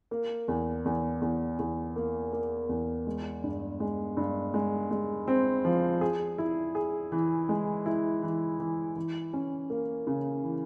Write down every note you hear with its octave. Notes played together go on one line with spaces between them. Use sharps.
A#3
E2
E2
E2
E2
A#3
A#3
E2
G#3
G2
G#3
G2
G#3
G#3
C4
F3
G#4
E4
G#4
E3
G#3
E4
E3
E3
E3
C#4
A#3
C#3
E3